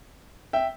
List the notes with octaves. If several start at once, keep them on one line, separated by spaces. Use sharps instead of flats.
E5 G5